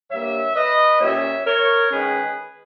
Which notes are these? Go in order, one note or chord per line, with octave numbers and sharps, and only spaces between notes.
G2 G3 A#3 C#5 E5
B4 D#5
A#2 G3 C#4 C#5 E5
A#4 C#5
D#3 G#3 C#4 G#4 B4